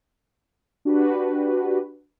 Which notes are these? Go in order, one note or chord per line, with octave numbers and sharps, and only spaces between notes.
D4 F#4 G4 B4